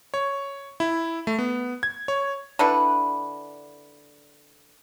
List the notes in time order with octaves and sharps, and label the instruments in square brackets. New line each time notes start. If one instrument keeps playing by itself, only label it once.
[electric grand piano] C#5
E4
A3
B3
G#6
C#5
[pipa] D3 D4 E4 B4